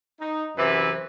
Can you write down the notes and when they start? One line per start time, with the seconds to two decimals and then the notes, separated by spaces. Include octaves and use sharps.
0.19 D#4
0.57 F#2 C3 E3 B4